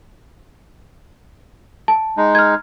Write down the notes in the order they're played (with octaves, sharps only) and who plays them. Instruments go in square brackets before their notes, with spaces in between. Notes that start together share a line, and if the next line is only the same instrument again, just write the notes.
[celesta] A5
[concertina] G#3 D#4
[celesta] F6 G#6